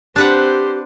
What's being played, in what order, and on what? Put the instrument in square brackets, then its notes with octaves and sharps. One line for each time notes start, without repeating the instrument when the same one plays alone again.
[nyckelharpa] C4 C5 [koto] D4 B4 F#5 [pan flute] G4